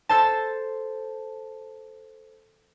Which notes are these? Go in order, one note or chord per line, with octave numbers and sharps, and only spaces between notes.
A4 C5 A5